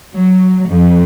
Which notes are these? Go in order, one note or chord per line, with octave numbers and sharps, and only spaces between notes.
F#3
F2